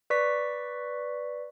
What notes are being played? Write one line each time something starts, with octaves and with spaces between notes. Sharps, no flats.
B4 D5 C#6 B6